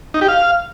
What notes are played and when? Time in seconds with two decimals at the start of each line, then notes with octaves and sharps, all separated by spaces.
0.14 D#4
0.21 G4
0.28 F5